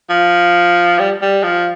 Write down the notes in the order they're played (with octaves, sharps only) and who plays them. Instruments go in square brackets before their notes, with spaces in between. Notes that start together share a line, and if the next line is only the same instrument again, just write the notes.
[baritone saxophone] F3
G3
G3
F3